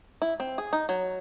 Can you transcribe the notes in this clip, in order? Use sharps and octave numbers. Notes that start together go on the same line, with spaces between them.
E4
C4
G#4
D#4
F#3